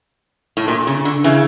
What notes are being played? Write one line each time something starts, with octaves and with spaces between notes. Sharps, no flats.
A2
A#2
C#3
D3
C#3 E3